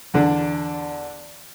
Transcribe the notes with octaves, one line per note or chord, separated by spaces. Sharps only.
E2 D3 D4